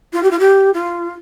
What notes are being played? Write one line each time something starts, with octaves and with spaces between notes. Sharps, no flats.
F4
G4
F4
G4
F4